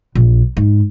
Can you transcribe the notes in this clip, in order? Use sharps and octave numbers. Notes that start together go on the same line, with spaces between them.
A#1
G#2